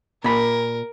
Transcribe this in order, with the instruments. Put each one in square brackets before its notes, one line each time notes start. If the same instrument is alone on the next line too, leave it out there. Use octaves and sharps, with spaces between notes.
[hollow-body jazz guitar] A#2 B5 [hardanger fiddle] A#4